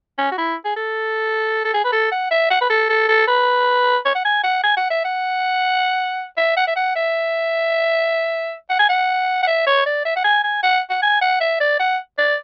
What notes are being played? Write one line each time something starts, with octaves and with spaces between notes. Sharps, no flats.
C#4
F#4
E4
G#4
A4
A4
G#4
B4
A4
F#5
E5
F#5
B4
A4
A4
A4
B4
C#5
F#5
G#5
F#5
G#5
F#5
E5
F#5
E5
F#5
E5
F#5
E5
F#5
G#5
F#5
F#5
E5
C#5
D5
E5
F#5
G#5
G#5
F#5
F#5
G#5
F#5
E5
D5
F#5
D5